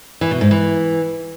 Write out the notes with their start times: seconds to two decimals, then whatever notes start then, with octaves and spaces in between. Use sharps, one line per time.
0.21 E3
0.31 B2
0.41 G#2
0.51 E3